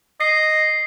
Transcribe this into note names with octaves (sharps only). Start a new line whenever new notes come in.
D#5 C7